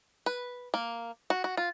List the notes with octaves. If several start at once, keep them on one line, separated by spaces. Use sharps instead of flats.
B4
A#3
F#4
F#4
F4